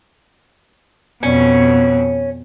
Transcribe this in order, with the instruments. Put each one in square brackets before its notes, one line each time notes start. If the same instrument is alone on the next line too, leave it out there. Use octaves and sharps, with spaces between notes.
[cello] F2 B2 [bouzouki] C#4